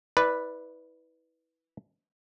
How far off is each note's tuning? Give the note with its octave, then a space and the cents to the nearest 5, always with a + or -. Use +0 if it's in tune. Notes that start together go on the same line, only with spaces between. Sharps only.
E4 -30 B4 +0 D5 +0